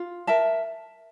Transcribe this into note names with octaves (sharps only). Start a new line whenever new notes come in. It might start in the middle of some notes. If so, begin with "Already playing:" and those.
Already playing: F4
A#4 E5 A5